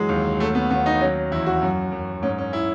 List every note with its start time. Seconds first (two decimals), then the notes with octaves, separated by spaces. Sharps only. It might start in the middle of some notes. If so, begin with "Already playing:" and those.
Already playing: F#2 E3 F#3 G#3
0.09 D#2
0.40 F#3 A3
0.55 B3
0.70 D#2 B3
0.86 D#4
1.01 F#3 C#4
1.31 E2 E4
1.46 F#4
1.62 F#2
1.92 F#2
2.22 G#2 C#4
2.38 C#4
2.53 E4